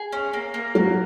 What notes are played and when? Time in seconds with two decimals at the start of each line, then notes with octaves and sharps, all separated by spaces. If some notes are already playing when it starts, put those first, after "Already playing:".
Already playing: G#4
0.12 C#4
0.33 A#3
0.54 A#3
0.75 F#3 A#3